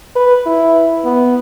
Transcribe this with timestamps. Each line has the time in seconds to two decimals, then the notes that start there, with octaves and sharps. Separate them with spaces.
0.16 B4
0.46 E4
1.05 B3